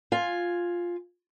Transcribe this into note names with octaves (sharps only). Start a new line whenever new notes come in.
F4 G#5